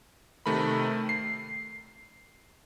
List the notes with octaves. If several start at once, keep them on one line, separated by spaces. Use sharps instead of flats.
C3 D#3 A3 A#4 B5
C7